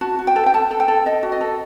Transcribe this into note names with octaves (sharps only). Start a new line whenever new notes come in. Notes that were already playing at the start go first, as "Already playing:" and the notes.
F#4 A5
F#4
G5
A4
G5
A4 A5
A4
G5
A4
A4 D#5
F#4
D#5
A4